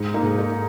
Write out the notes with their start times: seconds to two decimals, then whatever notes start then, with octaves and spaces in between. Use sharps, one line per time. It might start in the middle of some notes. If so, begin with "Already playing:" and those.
Already playing: G#2
0.14 A#3 D#4
0.22 G#2
0.38 A#3 D#4